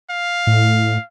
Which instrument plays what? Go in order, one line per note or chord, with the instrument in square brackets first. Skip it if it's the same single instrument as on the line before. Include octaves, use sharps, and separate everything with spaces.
[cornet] F5
[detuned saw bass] A2